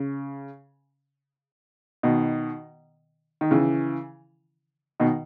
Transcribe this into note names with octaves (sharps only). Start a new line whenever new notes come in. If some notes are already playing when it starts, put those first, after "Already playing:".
Already playing: C#3
B2 D#3
D#3
C#3 E3
B2 D#3